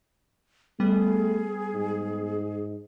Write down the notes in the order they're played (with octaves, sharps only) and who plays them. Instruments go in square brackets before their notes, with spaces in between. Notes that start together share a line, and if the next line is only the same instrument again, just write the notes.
[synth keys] G3 B3 [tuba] A3 [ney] G#4
[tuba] G#2